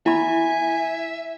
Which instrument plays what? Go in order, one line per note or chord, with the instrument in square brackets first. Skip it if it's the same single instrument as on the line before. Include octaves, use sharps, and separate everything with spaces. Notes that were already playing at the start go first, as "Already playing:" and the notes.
[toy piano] E4 B5 [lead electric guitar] E5 [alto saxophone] G#5